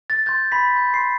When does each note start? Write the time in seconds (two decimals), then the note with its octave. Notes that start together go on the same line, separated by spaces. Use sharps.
0.10 A6
0.26 C6 G6 A6
0.52 B5 B6
0.76 C6 G6
0.94 C6 C7